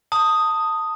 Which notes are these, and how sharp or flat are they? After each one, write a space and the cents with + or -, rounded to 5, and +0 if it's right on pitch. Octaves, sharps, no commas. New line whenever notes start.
A5 +25 D#6 +0